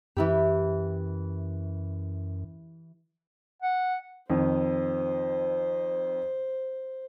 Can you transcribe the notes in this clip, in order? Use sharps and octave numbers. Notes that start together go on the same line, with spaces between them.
F#2 E3 E4 G4
F#5
F2 D#3 C5